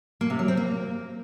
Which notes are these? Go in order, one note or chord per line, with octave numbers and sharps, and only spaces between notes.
A#3
C3
F#3
C4
A#3